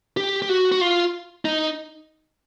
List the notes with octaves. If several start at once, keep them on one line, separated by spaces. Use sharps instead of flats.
G4
G4
F#4
F#4
F4
D#4